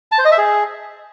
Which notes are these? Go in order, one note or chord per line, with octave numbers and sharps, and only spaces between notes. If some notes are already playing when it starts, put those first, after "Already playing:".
A5
C5
D#5
E5
G#4